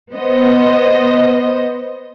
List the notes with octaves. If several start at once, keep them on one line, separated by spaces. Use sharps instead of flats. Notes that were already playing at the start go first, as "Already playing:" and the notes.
B3 C5 D#5